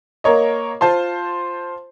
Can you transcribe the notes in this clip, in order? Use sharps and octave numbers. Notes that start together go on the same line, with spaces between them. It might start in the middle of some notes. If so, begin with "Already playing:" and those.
A#3 A#4 C#5 D#5
F4 C5 A5 C6